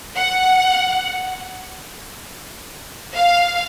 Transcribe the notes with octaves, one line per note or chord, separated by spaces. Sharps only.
F#5
F5